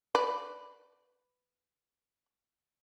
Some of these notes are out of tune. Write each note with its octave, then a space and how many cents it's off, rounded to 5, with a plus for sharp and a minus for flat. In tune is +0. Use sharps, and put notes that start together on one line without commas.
B4 +10 D5 -5